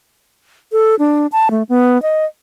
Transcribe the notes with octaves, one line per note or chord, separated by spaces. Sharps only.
A4
D4
A5
A3
B3
D#5